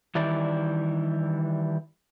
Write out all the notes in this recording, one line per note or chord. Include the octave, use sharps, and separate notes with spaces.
D#3 E3 G3 E4 D5